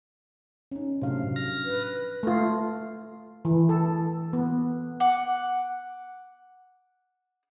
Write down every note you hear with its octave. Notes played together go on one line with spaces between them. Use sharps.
C#4 D#4
A2 C3 F#3 D4 F5
F3 F6 A#6
B4
A3 F4
E3
A4
B3
F#5 D6